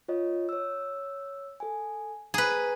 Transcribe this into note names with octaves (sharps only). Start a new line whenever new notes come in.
F4 C#5 D#5
C#5 E6
A4 G#5
G#4 B4 A#5